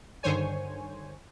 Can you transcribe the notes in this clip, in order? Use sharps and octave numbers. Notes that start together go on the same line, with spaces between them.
G2 D3 D#3 C5 C#5 G#5